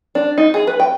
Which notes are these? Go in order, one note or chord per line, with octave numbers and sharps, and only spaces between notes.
D4
D#4
G#4
B4
G5